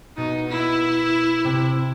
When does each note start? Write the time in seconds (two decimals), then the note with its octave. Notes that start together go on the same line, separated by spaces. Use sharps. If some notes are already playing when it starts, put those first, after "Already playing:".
0.17 B2 B3 D#4
0.49 E4
1.44 C3 C4